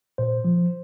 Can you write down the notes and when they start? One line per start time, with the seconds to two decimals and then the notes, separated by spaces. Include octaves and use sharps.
0.18 A#2 C5
0.45 F3